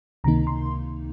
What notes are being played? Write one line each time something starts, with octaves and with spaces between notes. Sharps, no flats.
C#2 C3 D#3 A#3 D#4 A#5
C6